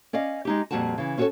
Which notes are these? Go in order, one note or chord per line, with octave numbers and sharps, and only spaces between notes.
C#4 D5 D#5 F5
G#3 D#4 G4
F2 A#2 G3 F#4 F#5 A5
C#3 E3
C#4 F4 F#4 G#4 A4 C#5